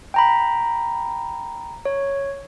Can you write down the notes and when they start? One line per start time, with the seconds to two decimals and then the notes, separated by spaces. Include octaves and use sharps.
0.14 G5 A#5 B5
1.85 C#5